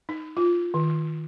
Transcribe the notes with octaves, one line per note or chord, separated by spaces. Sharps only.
D#4
F4
D#3